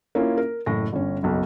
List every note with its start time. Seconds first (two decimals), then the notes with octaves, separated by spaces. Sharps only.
0.15 A#3 C#4 E4 F4
0.38 A#4
0.66 F#1 A2 A#6
0.93 G1 C#4
1.23 F#1 B1